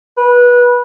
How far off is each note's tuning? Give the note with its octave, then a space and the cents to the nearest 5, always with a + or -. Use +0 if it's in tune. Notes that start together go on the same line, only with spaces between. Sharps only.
B4 -20